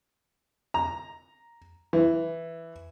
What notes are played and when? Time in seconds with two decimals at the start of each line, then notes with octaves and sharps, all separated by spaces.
0.74 A#5
1.93 E3